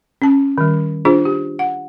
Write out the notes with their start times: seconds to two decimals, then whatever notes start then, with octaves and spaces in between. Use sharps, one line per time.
0.22 C#4 A5
0.58 D#3 G3
1.05 D4 F4 G#4 C5
1.25 G4
1.59 F#5